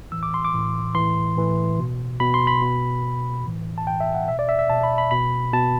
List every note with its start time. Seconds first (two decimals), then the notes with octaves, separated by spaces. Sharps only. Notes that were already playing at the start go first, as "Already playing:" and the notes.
0.12 A2 E3 E6
0.23 D6
0.34 C6
0.45 D6
0.53 A2 E3
0.95 A2 E3 C6
1.37 A2 E3
1.79 B2
2.20 B2 B5
2.34 C6
2.47 B5
2.62 B2
3.03 B2
3.45 A2 E3
3.78 A5
3.87 A2 E3 G5
4.00 E5
4.15 F#5
4.28 B2 E5
4.39 D5
4.49 E5
4.59 E5
4.70 B2 A5
4.84 B5
4.98 B5
5.11 B2 B5
5.53 B2 A5